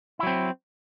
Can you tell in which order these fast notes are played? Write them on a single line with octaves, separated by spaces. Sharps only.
E4 F#3 C4